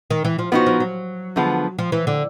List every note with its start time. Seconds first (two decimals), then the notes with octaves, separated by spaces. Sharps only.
0.11 D#3
0.24 E3
0.38 F3
0.52 F3 B3 D#4 F#4
0.66 F3
0.80 F#3
1.36 D3 F3 G#3 B3
1.79 F3
1.92 E3
2.07 D3